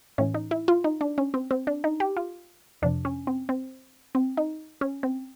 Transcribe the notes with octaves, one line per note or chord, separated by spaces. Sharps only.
A2 E3 C#4
D#4
E4
F4
D#4
D4
C#4
C4
C4
D4
D#4
G4
F4
F2 C3 F3 D4
C#4
C4
C4
C4
D#4
C#4
C4